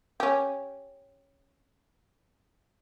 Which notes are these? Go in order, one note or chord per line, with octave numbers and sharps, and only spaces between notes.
C#4 G4